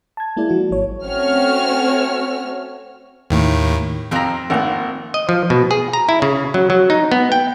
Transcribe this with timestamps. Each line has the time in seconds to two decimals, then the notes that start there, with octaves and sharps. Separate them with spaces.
0.17 A5 G#6
0.37 G#3 A#3 E4 G#4 D5
0.49 F3 F#4
0.71 G#1 F#3 C#5
1.05 A3 C4 C#4 F#4 C#5 F6
3.30 D#2 A2 D#3
4.11 F2 F3 C4 A#5
4.50 G#1 A#3 F#5
5.14 D#5
5.29 F3
5.50 B2
5.71 G#4
5.93 A#5
6.09 E4
6.22 C#3
6.54 F#3
6.70 F#3
6.90 D#4
7.12 B3
7.32 G5